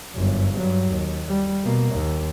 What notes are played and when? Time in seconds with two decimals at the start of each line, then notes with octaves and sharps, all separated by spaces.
0.13 G1 F#2
0.56 G2 F#3
0.91 D#2
1.27 G3
1.64 B2 A#3
1.93 D#2